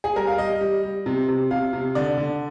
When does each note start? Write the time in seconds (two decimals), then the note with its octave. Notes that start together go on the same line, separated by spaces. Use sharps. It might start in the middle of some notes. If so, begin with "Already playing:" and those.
0.04 G#4
0.16 G3 A#4
0.27 F5
0.38 G3 D#5
0.61 G3
0.83 G3
1.06 C3
1.28 C3
1.51 C3 F5
1.73 C3
1.95 D3 D5
2.18 D3